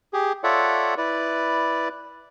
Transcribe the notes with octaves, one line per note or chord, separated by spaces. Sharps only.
G4 G#4
F4 A4 C#5 D5 E5 F#5
E4 B4 D5